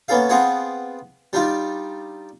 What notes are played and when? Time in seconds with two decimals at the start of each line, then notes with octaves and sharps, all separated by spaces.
0.08 A#3 B3 C#4 A4 F5
0.29 B3 C4 F4 G#4 F#5 G#5
1.33 G3 D4 D#4 F4